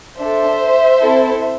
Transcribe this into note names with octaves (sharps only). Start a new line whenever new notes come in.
D4 A4 C5 E5
C4 E4 A4